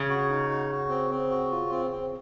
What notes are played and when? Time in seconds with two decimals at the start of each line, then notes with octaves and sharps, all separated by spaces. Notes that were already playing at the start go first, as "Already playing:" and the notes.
Already playing: C#3
0.09 F#4
0.30 D#4
0.50 F#4
0.70 F#4
0.89 C4
1.10 C4
1.30 F#4
1.50 F4
1.71 C4
1.91 C4